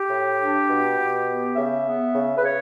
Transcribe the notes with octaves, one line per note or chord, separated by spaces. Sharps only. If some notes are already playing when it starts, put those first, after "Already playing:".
Already playing: G4
A2
D4
B2
B2
B3
C#3 E5
B3
C#3
B4
C#3 C#5